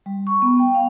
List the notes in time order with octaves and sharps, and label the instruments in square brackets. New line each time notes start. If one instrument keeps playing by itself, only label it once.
[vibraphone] G3
C#6
B3
G5
F5